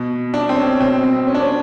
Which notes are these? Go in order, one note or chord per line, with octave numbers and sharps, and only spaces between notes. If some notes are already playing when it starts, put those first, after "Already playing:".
Already playing: B2
D4
C4
C#4
B2 C4
C4
C#4
D4
C#4